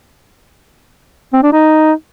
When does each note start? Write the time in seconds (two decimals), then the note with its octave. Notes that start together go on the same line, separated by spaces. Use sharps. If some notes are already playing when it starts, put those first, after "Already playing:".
1.33 C4
1.43 D4
1.53 D#4